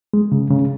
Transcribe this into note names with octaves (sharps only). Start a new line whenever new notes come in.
G#3
C#3
C#3